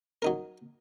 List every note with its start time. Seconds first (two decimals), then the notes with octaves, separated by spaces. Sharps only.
0.22 F#3 D#4 A#4